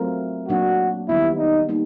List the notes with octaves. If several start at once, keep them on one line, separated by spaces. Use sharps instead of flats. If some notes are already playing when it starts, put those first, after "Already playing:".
Already playing: F#3 A3 C4 F4 A#4
A#2 F#3 A#3 D4 F#4
D#3 G3 B3 E4
D#4
G3 A#3 D#4